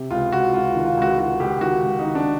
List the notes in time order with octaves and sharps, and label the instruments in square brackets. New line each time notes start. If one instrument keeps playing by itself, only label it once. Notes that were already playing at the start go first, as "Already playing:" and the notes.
Already playing: [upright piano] C3
C#2 F4
C#2 F#4
C#2 F4
D#3
F4
C#2 F#4
D#3 F#4
C#2 G4
D#3 F#4
C#2
D#4
D#3
D4